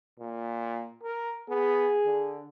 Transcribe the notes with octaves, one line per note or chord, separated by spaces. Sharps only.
A#2
A#4
B3 G#4
D3